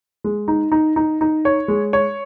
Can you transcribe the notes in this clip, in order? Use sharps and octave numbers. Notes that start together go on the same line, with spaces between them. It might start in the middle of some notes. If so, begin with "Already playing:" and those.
G#3
D#4
D#4
D#4
D#4
C#5
G#3
C#5